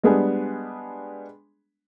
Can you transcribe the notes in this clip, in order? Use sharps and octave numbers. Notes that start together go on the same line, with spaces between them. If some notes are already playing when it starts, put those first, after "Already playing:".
G3 G#3 B3 D4 G#4